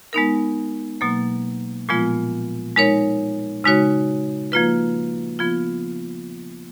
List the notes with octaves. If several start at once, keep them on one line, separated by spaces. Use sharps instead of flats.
G#3 B3 D#4 A#4
B2 F#3 A#3
A#2 F3 G#3 B3 F4
G#3 D#4 A#4 C#5
C#3 G#3 D#4 F#4 C#5
F3 A#3 F4 B4
F3 B3 F4